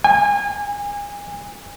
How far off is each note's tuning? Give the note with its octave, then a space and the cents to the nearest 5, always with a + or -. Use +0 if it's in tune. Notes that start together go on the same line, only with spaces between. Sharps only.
G#5 -30